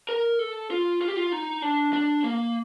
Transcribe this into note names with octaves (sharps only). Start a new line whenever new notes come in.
A#4
A4
F4
F4
G4
F4
D#4
D4
D4
A#3